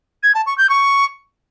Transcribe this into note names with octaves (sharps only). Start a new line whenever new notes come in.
G#6
A5
C#6
G6
C#6